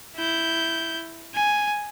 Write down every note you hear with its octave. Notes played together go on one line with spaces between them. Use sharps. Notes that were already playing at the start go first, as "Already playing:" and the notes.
E4 G6
G#5